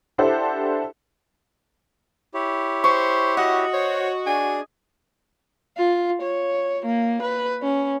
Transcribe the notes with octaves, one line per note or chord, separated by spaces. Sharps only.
D4 E4 G4 A4 C5 F#5
E4 G4 C#5
C5 C#6
F#4 D#5 F#5
C5 C#5
D4 G#4 G#5
F4
C#5
A#3
B4
C#4